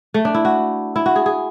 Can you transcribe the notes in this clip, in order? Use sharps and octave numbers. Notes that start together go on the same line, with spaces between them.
A3
D4
E4
F#4
E4
F#4
G#4
G#4